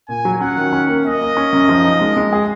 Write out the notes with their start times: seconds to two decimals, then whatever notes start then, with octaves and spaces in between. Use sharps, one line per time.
0.09 A#2 G#5
0.25 F#3
0.40 C#4 F#5
0.57 D#3
0.73 C#4
0.88 A#3
1.05 A#3 D#5
1.21 A#3
1.37 C#4
1.53 F#2
1.69 F3
1.85 D#4
2.01 G#3
2.17 G#3
2.33 G#4